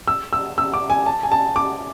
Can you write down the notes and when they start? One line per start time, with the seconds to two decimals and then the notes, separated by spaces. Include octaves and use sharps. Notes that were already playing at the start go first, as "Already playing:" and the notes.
0.08 E6
0.33 E6
0.58 E6
0.74 D6
0.90 G#5
1.06 A5
1.23 G#5
1.32 A5
1.56 D6